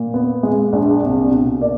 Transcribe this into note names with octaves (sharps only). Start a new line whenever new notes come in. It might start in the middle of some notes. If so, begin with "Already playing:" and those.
Already playing: A#2
B3
G#3
A#1
C2
B2
A#3 D5